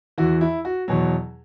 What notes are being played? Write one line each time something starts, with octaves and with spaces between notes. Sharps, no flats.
E2 E3 F#4
E4
F#4
E2 B2 F#3